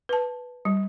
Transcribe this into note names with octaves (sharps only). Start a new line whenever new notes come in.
B4 A5
G3